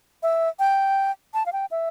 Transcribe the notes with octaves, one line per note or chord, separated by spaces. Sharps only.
E5
G5
A5
F5
G5
E5